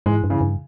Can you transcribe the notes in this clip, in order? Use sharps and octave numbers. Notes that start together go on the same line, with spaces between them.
G#2 E3 G#3
G2
C#3 E3
G2